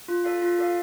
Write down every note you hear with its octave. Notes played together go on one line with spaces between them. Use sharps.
F4
A4 D5 F5
F4
A4 D5 F5